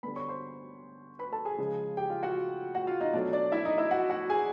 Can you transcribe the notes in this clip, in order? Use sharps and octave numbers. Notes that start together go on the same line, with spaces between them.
D3 G3 B3 B4 B5
C#5 C#6
C5 C6
B4 B5
A4 A5
G#4 G#5
C#3 F3 G#3
G4 G5
F4 F5
F#4 F#5
F#4 F#5
F4 F5
D#4 D#5
B2 F#3 A3 D4 D5
D4 D5
E4 E5
D#4 D#5
E4 E5
F#4 F#5
F#4 F#5
G#4 G#5